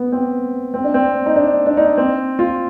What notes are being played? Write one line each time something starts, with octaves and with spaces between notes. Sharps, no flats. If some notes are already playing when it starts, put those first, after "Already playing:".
Already playing: B3
C4
C4
D4
C4
D#4
D4
D4
D#4
C4
F4